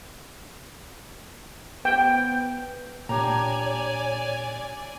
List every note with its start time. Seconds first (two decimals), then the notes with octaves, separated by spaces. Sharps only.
1.85 B3 G5
3.09 A#2 D4 G4 C#5 D5 G#5 A#5